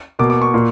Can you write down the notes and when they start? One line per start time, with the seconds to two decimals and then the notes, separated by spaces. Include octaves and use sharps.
0.19 B2 A#3 D6
0.30 D6
0.42 C#6
0.54 A#2 A#3